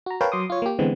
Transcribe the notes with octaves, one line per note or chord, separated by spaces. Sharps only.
F#4 A#5
A#4 B4 C#5 F5 G5 A5
F#3 C6 D6 D#6
F4 C#5
A#3 G4
D3 E3 G#3 B3 C4